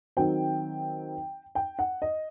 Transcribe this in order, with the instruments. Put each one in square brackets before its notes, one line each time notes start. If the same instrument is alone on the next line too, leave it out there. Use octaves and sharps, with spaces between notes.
[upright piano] D#3 F#3 C4 G5
G5
F#5
D#5